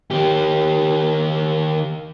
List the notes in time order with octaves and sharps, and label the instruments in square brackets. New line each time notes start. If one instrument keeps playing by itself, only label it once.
[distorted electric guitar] D#3 G4